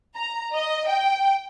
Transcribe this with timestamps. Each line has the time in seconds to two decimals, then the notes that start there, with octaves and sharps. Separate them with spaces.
0.15 A#5
0.54 D#5
0.88 G5